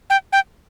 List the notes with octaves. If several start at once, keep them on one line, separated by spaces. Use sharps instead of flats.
G5
G5